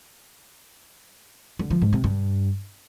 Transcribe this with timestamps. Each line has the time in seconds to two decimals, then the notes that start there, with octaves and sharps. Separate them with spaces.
1.59 D3
1.71 F3
1.82 G#2
1.93 C3
2.04 G2